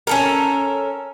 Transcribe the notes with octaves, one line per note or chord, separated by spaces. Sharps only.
C#4 A4 A#4